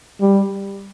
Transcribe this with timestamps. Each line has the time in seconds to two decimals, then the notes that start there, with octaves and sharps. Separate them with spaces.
0.21 G3